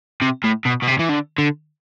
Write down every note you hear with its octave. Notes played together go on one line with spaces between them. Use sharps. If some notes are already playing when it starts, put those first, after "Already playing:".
C3
A2
B2
B2
C3
E3
D3
D3